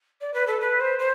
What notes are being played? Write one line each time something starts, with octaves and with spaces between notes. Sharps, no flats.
D5
B4
A4
B4
C5
C5